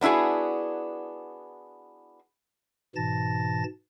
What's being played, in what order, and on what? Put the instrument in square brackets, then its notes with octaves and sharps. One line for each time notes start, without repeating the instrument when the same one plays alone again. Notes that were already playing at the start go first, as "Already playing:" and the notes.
[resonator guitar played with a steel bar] B3 D4 E4 F#4 G#4
[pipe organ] G#2 B2 E3 A5 A6 A#6